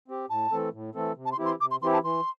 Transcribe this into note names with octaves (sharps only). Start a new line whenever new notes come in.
C4 G4
A2 A5
E3 A3 C4 A4
A2
E3 A3 C4 A4
C3
A5
C6
E3 C4 E4 G4
C6
C3 D6
C6
E3 C4 E4 G4 C6
A5
E3 C6